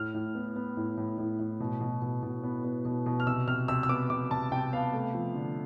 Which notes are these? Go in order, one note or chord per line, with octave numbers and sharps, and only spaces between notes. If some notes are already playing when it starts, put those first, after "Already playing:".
Already playing: A2 F6
A2
B3
B3
A2
A2
A2
A2
B2
B2
B2
B2
B3
B3
B2
B2
F6
C3 E6
C3 F6
C3 E6
E6
B3 D6
C3 D6
C3 A5
C3 G5
B3 F5
A3
F3
D3